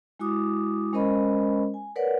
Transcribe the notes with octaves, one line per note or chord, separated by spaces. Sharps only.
G#3 E4 F#4 D6 D#6
G#3 C#4 A#4 C5 D#5 B5
G#5
A#4 B4 C#5 D5 F#5